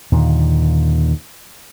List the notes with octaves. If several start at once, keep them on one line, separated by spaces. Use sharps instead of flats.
D#2 A#2 D3